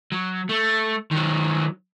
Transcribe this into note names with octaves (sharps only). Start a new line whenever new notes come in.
F#3
A3
D#3 F#3